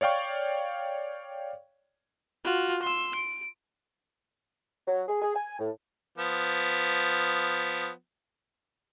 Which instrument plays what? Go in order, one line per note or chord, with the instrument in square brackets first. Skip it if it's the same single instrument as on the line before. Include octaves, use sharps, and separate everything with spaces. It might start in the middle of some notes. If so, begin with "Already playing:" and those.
[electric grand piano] C#5 D5 F5 G5 C#6
[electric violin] F4 F#4
C6 E6
D7
[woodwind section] F#3
G#4
G#4
G#5
A2
[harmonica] F3 B3